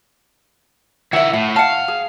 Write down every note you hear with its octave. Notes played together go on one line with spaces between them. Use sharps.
D#3 E4 E5 F#5
A2 F#5
F5 F#5 A5
G#4